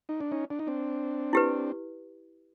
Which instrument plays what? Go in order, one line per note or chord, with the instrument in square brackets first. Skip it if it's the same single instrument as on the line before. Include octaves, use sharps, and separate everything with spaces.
[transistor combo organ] D#4
D4
C#4 D#4
D4
D#4
C4 D4
[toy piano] E4 G4 B4